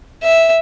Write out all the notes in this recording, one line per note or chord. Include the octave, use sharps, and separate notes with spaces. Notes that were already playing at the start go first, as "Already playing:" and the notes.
E5